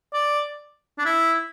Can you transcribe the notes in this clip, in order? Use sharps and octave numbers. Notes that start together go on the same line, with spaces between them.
D5
D4
E4